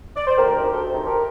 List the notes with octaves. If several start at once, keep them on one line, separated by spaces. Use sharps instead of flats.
D5
C5
D2 G4 A#4
C3 D#3
A#4
D2 A4 C5
C3 D#3
G4 A#4